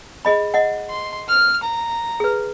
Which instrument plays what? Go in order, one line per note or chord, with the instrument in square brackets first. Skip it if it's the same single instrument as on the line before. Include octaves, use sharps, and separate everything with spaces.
[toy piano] G#4 D#5 B5
D#5 F#5
[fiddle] C6
F6
A#5
[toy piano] G#4 B4